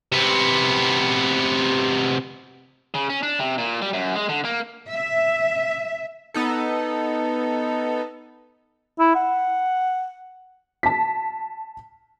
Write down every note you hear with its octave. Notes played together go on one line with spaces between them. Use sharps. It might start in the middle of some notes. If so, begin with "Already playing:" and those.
C3 B3
C#3
C#4
D4
C3
A#2
G3
F#2
G#3
D3
A#3
E5
B3 D#4 A4
E4
F#5
A5 B6